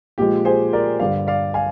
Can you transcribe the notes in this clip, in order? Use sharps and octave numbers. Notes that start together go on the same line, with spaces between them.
A#2 F3 G#3 G4
G#4 C5
A#4 D5
G2 D3 G3 D5 F5
D5 F5
F5 G#5